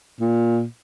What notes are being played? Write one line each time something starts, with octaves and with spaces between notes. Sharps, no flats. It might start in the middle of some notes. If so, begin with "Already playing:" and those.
A#2